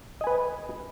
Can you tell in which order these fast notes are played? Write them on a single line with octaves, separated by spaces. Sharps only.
D#5 G#5 B4